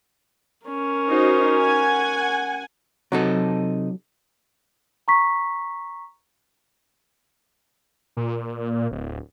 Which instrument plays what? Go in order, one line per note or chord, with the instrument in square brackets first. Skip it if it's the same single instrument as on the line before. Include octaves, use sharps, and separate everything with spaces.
[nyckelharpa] C#4 A#4
[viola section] D#4 F#4 C5
F#5 G#5
[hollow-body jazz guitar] C3 D#4 A4 [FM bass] F#3
[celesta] A#5 C#6 B6
[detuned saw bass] A#2
D1